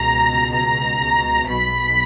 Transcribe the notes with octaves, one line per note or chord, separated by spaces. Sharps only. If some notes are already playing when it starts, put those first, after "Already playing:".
Already playing: C#2 B2 A#5
A#5
B1 B2 B5